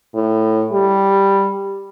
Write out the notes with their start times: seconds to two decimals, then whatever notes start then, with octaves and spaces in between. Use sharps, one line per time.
0.15 A2
0.72 G3